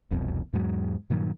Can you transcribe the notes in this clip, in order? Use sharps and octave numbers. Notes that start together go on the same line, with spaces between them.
E1 C2 F2 B2
E2 G#2 F#3 G#3
G2 A#2 D#3 F#3